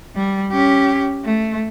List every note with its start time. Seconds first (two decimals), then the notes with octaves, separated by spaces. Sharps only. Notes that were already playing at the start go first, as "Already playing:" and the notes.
0.16 G3
0.52 C#4 G4
1.24 A3